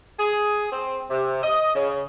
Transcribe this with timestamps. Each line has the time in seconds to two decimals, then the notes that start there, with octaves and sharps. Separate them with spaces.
0.17 G#4
0.71 C4
1.09 C3
1.43 D#5
1.73 C#3